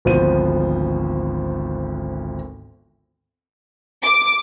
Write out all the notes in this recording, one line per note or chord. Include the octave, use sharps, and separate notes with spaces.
G#1 D2 F3 B3 C5 D#7
D6